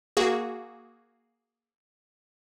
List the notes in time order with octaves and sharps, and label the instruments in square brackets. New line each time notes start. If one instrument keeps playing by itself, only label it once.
[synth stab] A#3 F#4 G#4